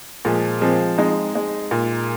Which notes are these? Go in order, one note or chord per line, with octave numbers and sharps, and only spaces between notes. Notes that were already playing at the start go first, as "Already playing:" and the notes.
A#2 F3 G#3
F3 G#3 C4
G#3 C4 D#4
G#3
A#2